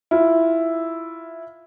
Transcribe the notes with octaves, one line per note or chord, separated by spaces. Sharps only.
E4 F4